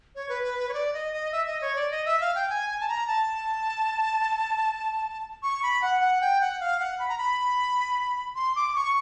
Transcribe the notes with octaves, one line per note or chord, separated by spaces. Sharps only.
C#5
B4
B4
B4
C#5
D5
D#5
D#5
E5
D#5
C#5
D5
D#5
E5
F5
G5
G#5
G#5
A5
A#5
A5
C#6
B5
F#5
F#5
G5
F#5
F5
F#5
B5
A#5
B5
C6
D6
C#6